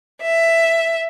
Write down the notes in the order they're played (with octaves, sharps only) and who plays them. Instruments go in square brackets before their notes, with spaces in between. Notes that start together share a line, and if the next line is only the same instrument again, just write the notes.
[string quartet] E5